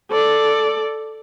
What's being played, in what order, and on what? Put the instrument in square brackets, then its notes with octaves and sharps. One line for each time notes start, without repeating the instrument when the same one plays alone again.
[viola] A4 D5